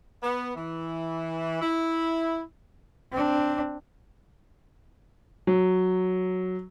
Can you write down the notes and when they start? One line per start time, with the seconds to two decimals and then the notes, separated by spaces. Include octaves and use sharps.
0.23 B3
0.56 E3
1.62 E4
3.12 C4 D4
5.47 F#3